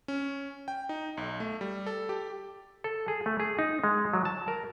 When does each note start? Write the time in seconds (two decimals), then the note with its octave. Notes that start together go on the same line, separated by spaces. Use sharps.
0.08 C#4
0.68 G5
0.89 D#4
1.17 B1
1.40 A3
1.61 G3
1.87 A4
2.09 G4
2.84 A4
3.08 G#4
3.26 A3
3.40 G#4
3.59 D#4
3.84 G#3
4.14 F#3
4.25 A5
4.48 A#4